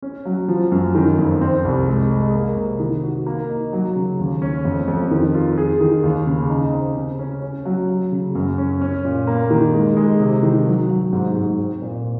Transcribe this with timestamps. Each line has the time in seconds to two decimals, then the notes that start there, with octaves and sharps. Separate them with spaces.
0.02 C#4
0.25 F#3
0.48 F3
0.72 F#2
0.95 D#3
1.18 F2
1.41 C4
1.64 C2
1.87 G#3
2.11 G#3
2.34 A#3
2.57 C3
2.80 D#3
3.03 F#4
3.26 A#3
3.49 D#4
3.73 F#3
3.96 C#3
4.19 D#2
4.42 C#4
4.65 F2
4.88 F2
5.11 D#3
5.34 F4
5.58 G#4
5.81 D#3
6.04 D#2
6.26 C#3
6.50 D#4
6.73 C4
6.96 C#3
7.19 C#4
7.42 C#4
7.65 F#3
7.89 F#3
8.12 C#3
8.35 F#2
8.58 C#4
8.81 C#4
9.05 A#2
9.27 A#3
9.51 D#3
9.74 G#3
9.97 G#3
10.20 C3
10.43 D#3
10.66 F#3
10.90 F#3
11.13 G#2
11.35 G#2
11.59 C4
11.82 A#2